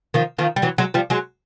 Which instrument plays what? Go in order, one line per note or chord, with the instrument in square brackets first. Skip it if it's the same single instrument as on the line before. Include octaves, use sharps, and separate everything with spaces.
[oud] D#3 F3
D#3 F3
G3
E3 F#3
F#3 G#3
F3 G3
F#3 G#3